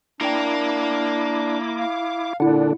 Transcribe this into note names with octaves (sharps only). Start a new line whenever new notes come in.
A#3 D4 E4 A#4 G5 A#5 D6
F5
A#2 D3 D4 E4 F#5